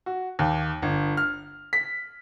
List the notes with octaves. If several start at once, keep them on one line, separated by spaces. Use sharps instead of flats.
F#4
D#2
G1
F6
B6